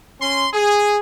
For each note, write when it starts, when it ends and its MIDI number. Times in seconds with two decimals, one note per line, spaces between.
0.20 0.48 61
0.20 0.48 84
0.53 1.00 68